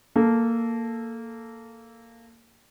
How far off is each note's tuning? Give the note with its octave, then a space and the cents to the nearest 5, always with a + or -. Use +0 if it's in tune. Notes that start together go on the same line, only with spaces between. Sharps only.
A#3 -10 A4 +0